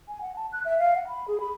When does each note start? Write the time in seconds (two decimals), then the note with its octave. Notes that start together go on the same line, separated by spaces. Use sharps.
0.08 G#5
0.21 F#5
0.36 A5
0.53 F#6
0.65 E5
0.79 F5
0.95 F#5
1.08 B5
1.28 G#4
1.40 B5